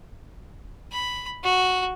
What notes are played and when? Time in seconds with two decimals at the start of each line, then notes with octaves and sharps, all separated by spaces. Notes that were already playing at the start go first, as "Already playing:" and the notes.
0.92 B5
1.44 F#4